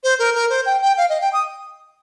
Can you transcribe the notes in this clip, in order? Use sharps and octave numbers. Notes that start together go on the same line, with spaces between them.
C5
A#4
A#4
C5
G5
G5
F5
D#5
G5
D#6